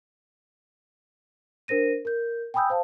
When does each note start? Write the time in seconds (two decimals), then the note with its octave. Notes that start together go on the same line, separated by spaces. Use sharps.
1.68 D4 A#4 C5 A#6 D#7
2.05 A#4 G6
2.54 G5 G#5 B5 D#6 E6 G6
2.70 C5 F5 A5